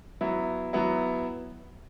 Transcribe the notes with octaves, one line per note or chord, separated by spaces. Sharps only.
F#3 B3 E4
F#3 B3 E4